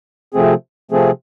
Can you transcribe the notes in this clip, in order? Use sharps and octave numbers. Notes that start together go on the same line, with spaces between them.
C3 F3 A3 C4 G#4
C3 F3 A3 C4 G#4